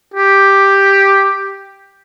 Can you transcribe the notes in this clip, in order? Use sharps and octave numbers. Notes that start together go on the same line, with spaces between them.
G4